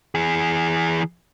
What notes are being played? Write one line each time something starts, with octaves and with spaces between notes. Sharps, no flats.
E3 G#4